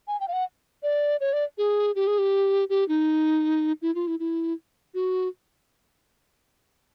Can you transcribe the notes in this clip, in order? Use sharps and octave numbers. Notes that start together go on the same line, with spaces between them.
G#5
G5
F5
F#5
D5
C#5
D5
G#4
G4
G#4
G4
G4
D#4
E4
F4
E4
E4
F#4